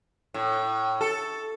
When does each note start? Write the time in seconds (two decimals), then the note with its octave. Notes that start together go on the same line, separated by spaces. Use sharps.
0.34 A2
1.01 A4